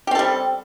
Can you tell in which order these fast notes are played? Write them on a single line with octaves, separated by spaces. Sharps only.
G4 C4 A4 G3